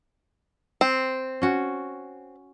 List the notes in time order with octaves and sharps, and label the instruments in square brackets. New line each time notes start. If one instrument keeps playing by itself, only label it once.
[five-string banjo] C4
[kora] C#4 F#4